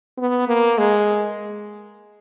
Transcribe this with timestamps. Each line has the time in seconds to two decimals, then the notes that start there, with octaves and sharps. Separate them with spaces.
0.18 B3
0.48 A#3
0.78 G#3